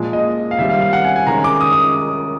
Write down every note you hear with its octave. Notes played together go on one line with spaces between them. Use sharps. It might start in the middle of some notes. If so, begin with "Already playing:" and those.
Already playing: A#2 F3 G#3
D#5
F5
D#3 G3 C4 E5
F5
F5
F#5
G#5
G#5
D#3 G#3 C#4 A#5
D6
D#6
D#6